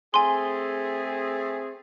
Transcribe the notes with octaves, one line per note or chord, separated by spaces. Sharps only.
A3 C4 G#4 G#5 C6